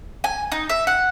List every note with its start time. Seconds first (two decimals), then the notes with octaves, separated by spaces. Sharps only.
0.24 G#5
0.52 D#4
0.69 E5
0.87 F#5